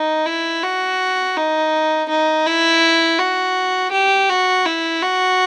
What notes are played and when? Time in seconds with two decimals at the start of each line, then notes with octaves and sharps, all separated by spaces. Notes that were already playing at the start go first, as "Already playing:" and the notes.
Already playing: D#4
0.26 E4
0.63 F#4
1.37 D#4
2.09 D#4
2.46 E4
3.19 F#4
3.92 G4
4.29 F#4
4.66 E4
5.02 F#4